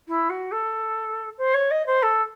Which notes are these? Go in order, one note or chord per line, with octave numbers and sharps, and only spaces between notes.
E4
F#4
A4
C5
C#5
D#5
C5
A4